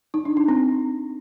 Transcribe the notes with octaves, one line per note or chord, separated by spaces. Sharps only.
D#4
D4
D4
C4